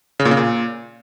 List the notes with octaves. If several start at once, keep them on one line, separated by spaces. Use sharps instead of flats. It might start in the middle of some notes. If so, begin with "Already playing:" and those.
C#3
A#2
C#3
A#2